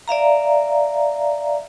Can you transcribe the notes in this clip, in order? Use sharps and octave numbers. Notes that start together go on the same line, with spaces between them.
D5 E5 F5 A#5